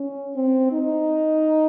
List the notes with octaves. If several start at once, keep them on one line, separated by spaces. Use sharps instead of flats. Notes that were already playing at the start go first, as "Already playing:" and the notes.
Already playing: C#4
C4
D#4